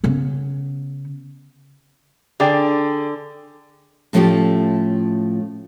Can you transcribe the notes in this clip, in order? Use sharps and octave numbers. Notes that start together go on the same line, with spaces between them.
C#3 B3
D3 G#4 D5 G5
A2 F3 A3 C#4 F4 G4